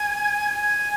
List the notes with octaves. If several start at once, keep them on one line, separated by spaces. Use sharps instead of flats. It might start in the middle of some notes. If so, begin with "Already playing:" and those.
Already playing: G#5
G#5